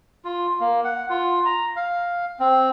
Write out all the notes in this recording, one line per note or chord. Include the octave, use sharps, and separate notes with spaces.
F4
A#3
F#5
F4
A#5
F5
C4